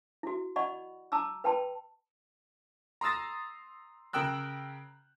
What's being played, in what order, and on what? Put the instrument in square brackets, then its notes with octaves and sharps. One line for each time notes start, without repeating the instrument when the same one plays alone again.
[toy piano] E4 F#4
D5 D#5 F#5 B5 C#6
A5 A#5 D6 E6
B4 G5 A5 B5
[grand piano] A#5 C6 D#6 E6 A6 A#6
C#3 A#4 G5 E6 F#6